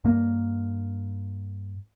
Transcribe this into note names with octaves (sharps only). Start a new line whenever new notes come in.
G2 A#3